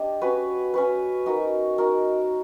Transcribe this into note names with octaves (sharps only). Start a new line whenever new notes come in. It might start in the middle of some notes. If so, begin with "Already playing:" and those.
Already playing: D4 G4 D#5
C#4 F#4 B4
C#4 F#4 B4
D#4 F#4 A#4
D#4 F#4 A#4